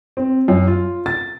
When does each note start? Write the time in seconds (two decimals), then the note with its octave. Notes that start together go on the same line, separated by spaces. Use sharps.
0.17 C4
0.48 F#2
0.67 F4
1.06 A6